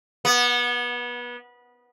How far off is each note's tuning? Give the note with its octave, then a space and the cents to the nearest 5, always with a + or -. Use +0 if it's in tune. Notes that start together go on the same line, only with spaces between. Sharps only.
B3 -25